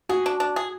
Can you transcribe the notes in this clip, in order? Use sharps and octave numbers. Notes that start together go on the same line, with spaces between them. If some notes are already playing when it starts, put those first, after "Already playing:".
F#4 G#4
D4
D4
G#4